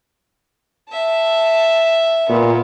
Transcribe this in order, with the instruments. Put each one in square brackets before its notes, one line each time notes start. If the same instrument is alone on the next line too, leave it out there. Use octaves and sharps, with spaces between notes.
[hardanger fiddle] E5 A5
[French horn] A#2 [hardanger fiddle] B3